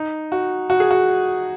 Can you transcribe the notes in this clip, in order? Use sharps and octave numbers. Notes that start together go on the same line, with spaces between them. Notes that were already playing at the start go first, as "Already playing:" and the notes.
Already playing: D#4
F#4
F#4
G#4
F#4